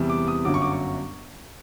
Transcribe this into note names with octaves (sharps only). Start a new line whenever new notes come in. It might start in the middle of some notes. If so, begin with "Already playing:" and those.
Already playing: E2 C3 E3 G3
D6
D#6
G1 F#2 D3 F#3 D6
C#6
D6
C#6